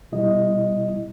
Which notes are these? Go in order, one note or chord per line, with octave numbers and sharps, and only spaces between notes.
B2 G3 E4 D#5